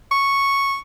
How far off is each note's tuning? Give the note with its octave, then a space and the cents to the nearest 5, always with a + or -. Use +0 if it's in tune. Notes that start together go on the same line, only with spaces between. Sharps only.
C#6 -5